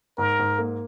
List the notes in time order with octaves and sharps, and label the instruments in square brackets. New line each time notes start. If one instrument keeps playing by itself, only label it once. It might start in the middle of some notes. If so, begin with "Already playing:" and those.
[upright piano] G#2 [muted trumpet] A#4
[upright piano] G#2
A#3